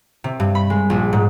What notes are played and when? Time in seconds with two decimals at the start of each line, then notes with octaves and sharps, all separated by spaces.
0.24 C3
0.40 G2
0.55 B5
0.70 G#3
0.90 A#1
1.13 G#2